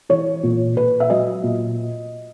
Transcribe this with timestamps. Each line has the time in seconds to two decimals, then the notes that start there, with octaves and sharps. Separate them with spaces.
0.09 E3 C#5
0.43 A#2
0.76 A#2 B4
1.00 E5
1.10 F#3 D#5
1.43 A#2